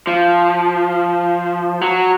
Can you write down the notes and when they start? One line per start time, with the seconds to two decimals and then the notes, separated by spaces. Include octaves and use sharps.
0.07 F3
1.81 F#3